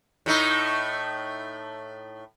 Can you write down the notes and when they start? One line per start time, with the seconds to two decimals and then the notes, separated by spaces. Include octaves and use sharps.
0.26 A2 A3 D#4